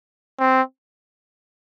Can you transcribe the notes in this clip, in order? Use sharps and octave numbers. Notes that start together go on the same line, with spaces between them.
C4